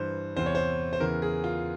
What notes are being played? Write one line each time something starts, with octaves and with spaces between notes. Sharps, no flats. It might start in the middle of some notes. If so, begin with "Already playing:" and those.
Already playing: G2 E3 C5
E2 C3 E3 C5
C#5
C5
C5
E2 C#3 E3 A#4
G#4
F4